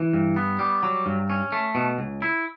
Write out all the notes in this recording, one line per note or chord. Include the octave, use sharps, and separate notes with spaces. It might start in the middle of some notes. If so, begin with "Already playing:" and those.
Already playing: E3
G2
B3
G3
F#3
G2
C#4
A3
B2
C#2
E4